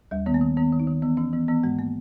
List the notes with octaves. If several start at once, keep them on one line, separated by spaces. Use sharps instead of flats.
D#2 G3
D#3 B3
A#3
D#3
D#3 B3
D#3
D#4
D#3
E3 B3
E3 C#4
E3 B3
E3 B3
G#2 G#3
A#3